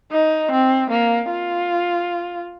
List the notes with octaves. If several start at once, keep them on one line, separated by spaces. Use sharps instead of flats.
D#4
C4
A#3
F4